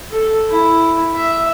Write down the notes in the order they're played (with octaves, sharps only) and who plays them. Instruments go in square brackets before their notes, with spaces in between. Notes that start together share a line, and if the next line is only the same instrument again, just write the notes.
[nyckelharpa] A4
E4
E5